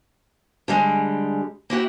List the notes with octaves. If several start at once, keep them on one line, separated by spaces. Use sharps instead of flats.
D3 G3 G#3
A#3 E4 F#4 G4